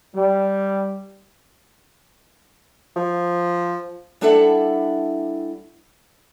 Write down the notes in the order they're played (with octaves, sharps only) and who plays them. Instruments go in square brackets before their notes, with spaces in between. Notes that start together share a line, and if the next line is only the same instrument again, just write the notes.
[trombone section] G3
[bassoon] F3
[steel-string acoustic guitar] G3 D4 E4 A4 E5 F#5